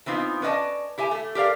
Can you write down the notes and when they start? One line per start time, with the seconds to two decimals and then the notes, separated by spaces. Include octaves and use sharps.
0.06 E3 B3 C4 D#4 F4
0.42 C#4 B4 D5 D#5 A5
0.98 E4 G4 E5 G#5
1.11 A3
1.35 G4 A#4 D5 F5